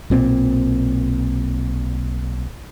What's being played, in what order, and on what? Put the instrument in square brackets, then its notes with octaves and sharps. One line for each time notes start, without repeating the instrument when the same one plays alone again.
[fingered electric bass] B1 A#2 C4